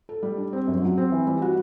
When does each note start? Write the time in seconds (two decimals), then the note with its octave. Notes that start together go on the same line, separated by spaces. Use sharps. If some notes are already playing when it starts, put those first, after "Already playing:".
0.09 A4
0.23 G3
0.38 D4
0.53 C4
0.68 F#2
0.82 F#3
0.98 C4
1.12 E3
1.27 G3
1.42 F#4